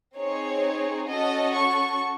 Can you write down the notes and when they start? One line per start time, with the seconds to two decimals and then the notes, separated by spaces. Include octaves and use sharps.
0.17 C4 D#4 G#4 C#5
1.10 C#4 F#4 A4 D#5
1.56 C#6